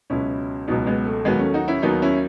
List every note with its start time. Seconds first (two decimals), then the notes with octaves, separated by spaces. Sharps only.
0.10 C#2 B2 F#3 C#4 E4
0.68 C#2 B2 F#3 B3 D#4
0.87 G#3 B3
1.06 A3
1.25 D#2 D#3 F#3 G#3 B3
1.39 A3 C#4
1.54 D#4 F#4
1.68 C#4 E4
1.83 D#2 D#3 F#3 B3 D#4
2.02 C#4 E4